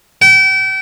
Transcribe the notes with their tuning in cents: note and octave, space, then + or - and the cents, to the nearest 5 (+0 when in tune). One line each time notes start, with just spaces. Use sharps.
G5 -35